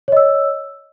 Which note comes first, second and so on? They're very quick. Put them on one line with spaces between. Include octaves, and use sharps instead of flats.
C#5 D#5 E6